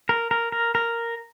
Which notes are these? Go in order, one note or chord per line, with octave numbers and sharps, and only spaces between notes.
A#4
A#4
A#4
A#4